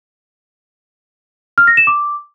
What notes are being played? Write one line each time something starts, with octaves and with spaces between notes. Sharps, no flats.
F6
A#6
E7
D6